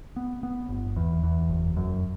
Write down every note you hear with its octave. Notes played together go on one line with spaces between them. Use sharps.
B3
B3
G1
E2
E2
F#1
F#2